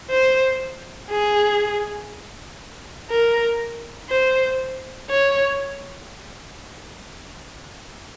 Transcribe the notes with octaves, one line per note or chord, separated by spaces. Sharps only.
C5
G#4
A#4
C5
C#5